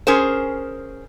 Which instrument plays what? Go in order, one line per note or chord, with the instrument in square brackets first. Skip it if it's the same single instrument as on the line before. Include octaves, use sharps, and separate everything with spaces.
[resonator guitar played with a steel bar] C#4 G#4 A#4 C5